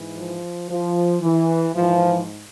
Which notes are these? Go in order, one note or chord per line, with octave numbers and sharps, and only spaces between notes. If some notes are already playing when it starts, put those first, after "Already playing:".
Already playing: G#2 E3
F3
F3
E3
G#2 E3 F3